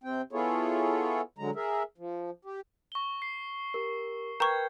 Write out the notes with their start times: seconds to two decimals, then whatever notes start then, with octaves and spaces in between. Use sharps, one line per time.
0.04 C3 C4 G5
0.33 B3 E4 F4 G#4 A4 C#5
1.38 D3 F#3 G#3 A#5
1.55 G#4 A#4 E5
1.98 F3
2.45 G4
2.92 C#6 G7
3.22 C7
3.74 G4 A#4
4.40 A#4 B4 G5 A#5 C#6 G6 G#6